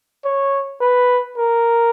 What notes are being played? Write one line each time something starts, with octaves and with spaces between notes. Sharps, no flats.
C#5
B4
A#4